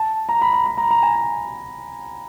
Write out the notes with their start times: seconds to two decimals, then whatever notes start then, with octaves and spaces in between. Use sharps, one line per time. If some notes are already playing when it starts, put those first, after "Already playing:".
Already playing: A5
0.29 A#5
0.42 B5
0.53 A#5
0.66 B5
0.78 A#5
0.91 A#5
1.03 G#5